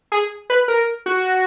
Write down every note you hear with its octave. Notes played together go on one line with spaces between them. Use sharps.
G#4
B4
A#4
F#4